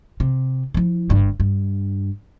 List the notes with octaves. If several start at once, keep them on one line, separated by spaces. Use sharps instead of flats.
C3
F3 E4
G1 G2
G2